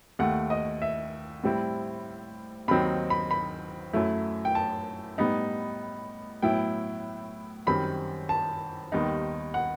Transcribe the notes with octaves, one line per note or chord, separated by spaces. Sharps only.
D#2 D#3 A3 F#5
D#5
E5
A2 G3 C4 E4
D#2 D#3 F#3 C4 D#4 B5
B5
B5
F#2 F#3 A3 E4
G5
A5
A2 G3 B3 D#4
A2 F#3 B3 E4 G5
F#2 D#3 G3 C4 B5
A5
D#2 D#3 G3 B3 D#4
F#5